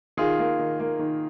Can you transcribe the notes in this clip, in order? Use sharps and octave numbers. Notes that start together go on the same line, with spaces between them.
D#3 F4 G#4
A#3
D#3
A#3
D#3